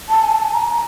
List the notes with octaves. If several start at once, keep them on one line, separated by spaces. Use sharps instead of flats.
A5
G#5
A5
G#5
A#5